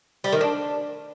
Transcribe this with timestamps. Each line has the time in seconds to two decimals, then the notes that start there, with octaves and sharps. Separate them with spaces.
0.24 G3
0.32 D#3
0.41 D4